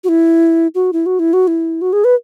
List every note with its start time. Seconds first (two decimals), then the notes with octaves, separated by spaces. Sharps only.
0.04 F#4
0.09 E4
0.75 F#4
0.93 E4
1.06 F#4
1.19 E4
1.33 F#4
1.47 E4
1.81 F#4
1.93 G#4
2.04 B4